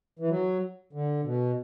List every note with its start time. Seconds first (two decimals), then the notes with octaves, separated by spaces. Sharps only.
0.19 E3
0.30 F#3
0.93 D3
1.24 B2